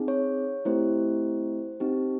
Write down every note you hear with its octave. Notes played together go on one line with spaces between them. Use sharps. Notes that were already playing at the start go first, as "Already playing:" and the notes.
Already playing: C4 D#4 G#4
C#5
A3 C4 E4 G4 C5
C4 D#4 G4